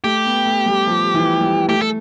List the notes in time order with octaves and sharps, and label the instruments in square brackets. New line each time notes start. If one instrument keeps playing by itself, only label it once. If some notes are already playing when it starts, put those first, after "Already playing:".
[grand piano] A3 [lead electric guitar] G4
[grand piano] B3
A3
G3
F3
E3
G3
[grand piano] A3 [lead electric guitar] G4
[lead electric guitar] A4